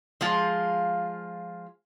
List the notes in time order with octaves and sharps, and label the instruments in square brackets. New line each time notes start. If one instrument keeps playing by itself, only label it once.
[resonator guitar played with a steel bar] F3 G#3 F4